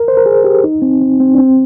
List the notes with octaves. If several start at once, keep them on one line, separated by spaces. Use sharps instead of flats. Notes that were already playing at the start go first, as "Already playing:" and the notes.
Already playing: A#4
C5
A#4
G#4
G4
D#4
C4
C4
C4
D4
C4